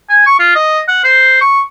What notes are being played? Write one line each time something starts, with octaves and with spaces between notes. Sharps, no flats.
G#5
C#6
F4
D#5
F#5
C5
C#6